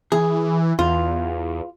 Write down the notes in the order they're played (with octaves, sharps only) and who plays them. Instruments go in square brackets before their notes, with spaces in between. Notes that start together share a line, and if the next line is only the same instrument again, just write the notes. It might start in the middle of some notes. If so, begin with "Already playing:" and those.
[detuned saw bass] E3 [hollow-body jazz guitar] G#4
[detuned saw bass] E2 [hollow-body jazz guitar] F4